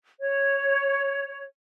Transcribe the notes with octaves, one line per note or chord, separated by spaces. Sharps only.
C#5